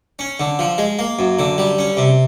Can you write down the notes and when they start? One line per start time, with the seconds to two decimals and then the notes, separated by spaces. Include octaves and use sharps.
0.19 C#4
0.40 D3
0.59 F3
0.78 G#3
0.99 A#3
1.19 F#2
1.39 D3
1.58 G3
1.78 C#4
1.97 C3